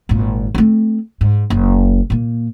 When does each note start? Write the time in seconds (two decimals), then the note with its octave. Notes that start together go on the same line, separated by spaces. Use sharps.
0.09 G#1 A#2
0.55 A3 C4
1.21 G#2
1.50 F#1
2.10 A#2 A#3